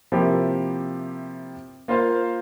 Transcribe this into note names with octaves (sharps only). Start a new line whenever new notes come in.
C3 F3 A#3 E4 G4
A#3 F4 C5 F5